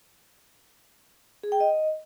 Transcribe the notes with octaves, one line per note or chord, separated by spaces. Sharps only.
G#4
G5
D#5